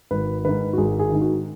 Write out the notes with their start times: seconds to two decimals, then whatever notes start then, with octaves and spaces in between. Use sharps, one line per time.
0.11 G#1 B4
0.44 G#2 D#3 B4
0.73 F#4
0.78 G#1 G#4
0.99 G#4
1.10 G#2 D#3
1.21 F#4